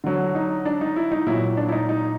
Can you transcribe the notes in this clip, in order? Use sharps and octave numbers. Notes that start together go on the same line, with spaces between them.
D3 F#3
D#4
D4
D#4
E4
D#4
A#2 F#3 E4
D4
E4
D#4
D#4